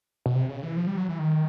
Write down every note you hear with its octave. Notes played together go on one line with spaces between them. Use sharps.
B2
C3
C#3
E3
F3
G3
F#3
E3
D#3